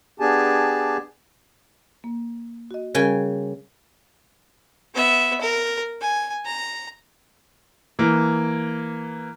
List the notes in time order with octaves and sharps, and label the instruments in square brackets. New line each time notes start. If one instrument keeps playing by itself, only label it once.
[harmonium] B3 D4 G4 G#4 G#5 A5
[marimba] A#3
F#4 D#5
[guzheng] C#3 G5 G#5 [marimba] G3 A#4
[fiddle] B3 E5
A#4
G#5
A#5
[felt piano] E3 A#3